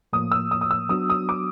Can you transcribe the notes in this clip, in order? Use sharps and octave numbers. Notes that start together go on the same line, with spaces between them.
A2 F3 A#3 D#6
E6
D#6
D#6
E6
F#3 B3 D4 F#4 D#6
D#6
D6